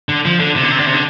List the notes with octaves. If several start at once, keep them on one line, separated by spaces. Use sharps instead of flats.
D3
F3
D3
C3
D3
C3
D3
C3
D3